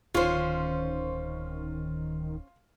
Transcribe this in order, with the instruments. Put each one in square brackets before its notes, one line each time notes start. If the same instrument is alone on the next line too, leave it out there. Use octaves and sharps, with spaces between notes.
[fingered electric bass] D1 [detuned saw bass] D#3 [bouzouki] C#4 C5 [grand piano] F4